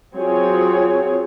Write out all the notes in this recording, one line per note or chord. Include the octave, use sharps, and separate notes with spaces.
F#3 C4 F4 G#4 C#5